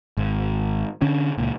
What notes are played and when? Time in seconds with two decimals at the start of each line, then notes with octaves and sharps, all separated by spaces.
0.17 G#1
1.02 D3 C#4
1.38 C#2 A#2